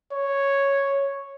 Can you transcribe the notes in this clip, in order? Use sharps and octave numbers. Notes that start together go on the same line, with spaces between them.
C#5